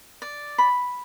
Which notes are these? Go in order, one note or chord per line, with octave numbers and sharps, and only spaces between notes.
D5
B5